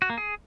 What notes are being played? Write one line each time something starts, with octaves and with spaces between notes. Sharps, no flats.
F#4
A#3
G#4